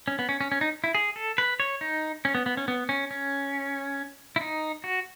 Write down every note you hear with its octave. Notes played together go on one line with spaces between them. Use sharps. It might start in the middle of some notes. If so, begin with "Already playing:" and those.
C#4
B3
C#4
C#4
C#4
D#4
E4
G#4
A4
B4
C#5
D#4
C#4
B3
B3
C#4
B3
C#4
C#4
E4
D#4
F#4